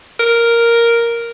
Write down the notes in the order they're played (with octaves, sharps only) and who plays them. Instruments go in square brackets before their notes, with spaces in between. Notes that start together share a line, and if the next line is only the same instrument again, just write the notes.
[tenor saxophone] A#4